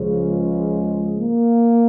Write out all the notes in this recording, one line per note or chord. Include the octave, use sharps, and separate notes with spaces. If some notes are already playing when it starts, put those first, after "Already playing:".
Already playing: C#2 C#3 F3
G#3
A#3